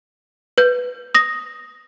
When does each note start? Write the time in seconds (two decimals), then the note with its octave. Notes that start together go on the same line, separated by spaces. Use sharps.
0.58 B4 G6
1.15 D#6 A#6